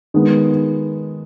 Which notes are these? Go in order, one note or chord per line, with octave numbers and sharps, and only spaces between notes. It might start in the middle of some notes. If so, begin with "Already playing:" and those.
D#3 G#3 B3